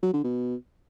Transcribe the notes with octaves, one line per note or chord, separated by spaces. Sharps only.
F#3
D3
B2